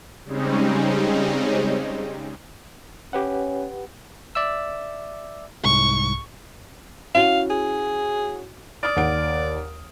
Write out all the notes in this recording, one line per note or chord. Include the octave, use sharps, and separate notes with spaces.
C#3 G3 G#3 C4 C#4 D#4
C#4 G4 B4 F#5
D5 E5 E6
C2 G#2 C#6
C#4 E4 F#4 F5
G#4
D5 D#6 F6
D#2 F#5 D7